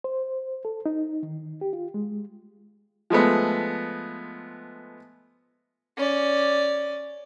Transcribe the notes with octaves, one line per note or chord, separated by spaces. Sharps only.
C5
A4
D#4
D#3
G4
F4
G#3
F3 G#3 A3 B3
C#4 D5